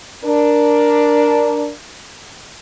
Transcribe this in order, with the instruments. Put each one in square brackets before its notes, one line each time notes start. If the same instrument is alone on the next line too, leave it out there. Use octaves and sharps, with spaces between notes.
[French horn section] D4 A#4